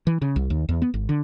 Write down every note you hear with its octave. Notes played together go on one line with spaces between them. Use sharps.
E3
C#3
C2
D#2
E2
B3
G#1
D3